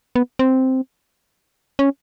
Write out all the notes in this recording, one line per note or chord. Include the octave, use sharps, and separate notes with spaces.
B3
C4
C#4